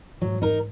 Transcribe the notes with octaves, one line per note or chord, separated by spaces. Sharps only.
G#2 F#3
D#4 A#4